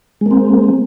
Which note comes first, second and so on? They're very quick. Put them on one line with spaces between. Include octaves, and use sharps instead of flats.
G#3 A#3 C4